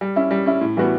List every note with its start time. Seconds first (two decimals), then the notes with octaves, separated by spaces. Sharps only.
0.01 G3
0.16 C#4 E4
0.31 G3
0.46 C#4 E4
0.61 A2
0.77 E3 G3 B3 F#4